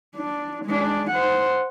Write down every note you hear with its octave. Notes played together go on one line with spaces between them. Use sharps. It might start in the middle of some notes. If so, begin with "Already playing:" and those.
D4
G#3 D4
C5 F#5